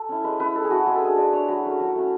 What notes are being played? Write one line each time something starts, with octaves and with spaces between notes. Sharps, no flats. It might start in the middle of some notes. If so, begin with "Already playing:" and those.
Already playing: A4
C#4 E4
G#3 B4
C#4 E4 B4
G#3 A4
G#4
C#4 E4 F#4
G#3 G#4
A4
D4 G#4
G#3 D5
D4 C#5
F#3 B4
A3 C#4
F#3
A3 C#4